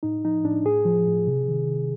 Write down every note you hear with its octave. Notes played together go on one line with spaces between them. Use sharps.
A2 D#4
F3 D#4
A2 D4
A2 G#4
F3
A2
C3
D#3
C3